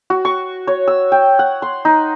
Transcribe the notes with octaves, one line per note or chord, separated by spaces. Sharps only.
F#4
C#6
C#5
E6
G5
F#5
C6
D#4